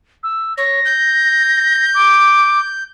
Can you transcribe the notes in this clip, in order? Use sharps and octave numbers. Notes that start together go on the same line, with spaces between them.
E6
C#5 A#6
G6
D6